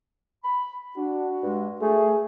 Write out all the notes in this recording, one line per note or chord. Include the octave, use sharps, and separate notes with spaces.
B5
D4 F#4
G2 G#3
A3 G#4